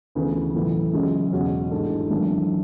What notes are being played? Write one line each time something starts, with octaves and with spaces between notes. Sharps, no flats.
D2 C#3 E3 B3
B1 A2 E3
F#2 C#3 G#3 C#4
E2 B2 G#3 C#4 F#4
A1 G#2 G#3 D4 A4
G#1 F#2 E3 A3 D4